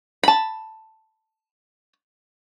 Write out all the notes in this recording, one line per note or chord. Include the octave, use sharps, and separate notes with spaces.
A5 B5